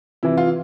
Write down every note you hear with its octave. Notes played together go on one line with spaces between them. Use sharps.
C3 E3 E4
F4